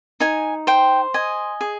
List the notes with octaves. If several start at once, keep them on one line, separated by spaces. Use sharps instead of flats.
D#4 G#5
C5 G5
D#5 G#5
G#4